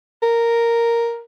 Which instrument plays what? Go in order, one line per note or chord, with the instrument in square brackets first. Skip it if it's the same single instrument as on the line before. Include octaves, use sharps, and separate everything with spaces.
[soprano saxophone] A#4